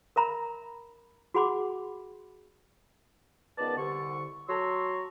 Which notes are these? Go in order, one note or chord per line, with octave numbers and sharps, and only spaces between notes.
A#4 E5 A#5 B5
F#4 G#4 F#5 B5 C6 D6
C#2 D#3 B3 B4 D5 A5
C2 D3 C#6
F#3 A5 A#5 C6 C#6 E6